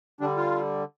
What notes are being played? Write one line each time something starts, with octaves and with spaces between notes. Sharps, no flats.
D3 G3 D4
F4